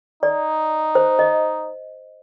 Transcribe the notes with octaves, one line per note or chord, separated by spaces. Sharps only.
D#4 D5
C5
D#5